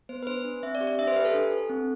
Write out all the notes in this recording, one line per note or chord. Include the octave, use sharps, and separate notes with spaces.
B3 C5
B4
D4 C5
D4
C4 E5
D5
G4
D5
D4 E5
C5
G4 B4
A4
D4
A4
C4